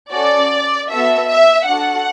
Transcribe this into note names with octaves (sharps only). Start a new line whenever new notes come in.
C#4 F#4 A4 D5
B3 F#4 A4 E5
E5
D4 F#4 A4 F#5